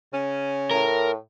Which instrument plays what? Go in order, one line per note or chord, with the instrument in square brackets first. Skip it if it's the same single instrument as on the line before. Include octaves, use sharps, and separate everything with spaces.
[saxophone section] C#3 C#4
[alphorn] A2 [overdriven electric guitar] A#4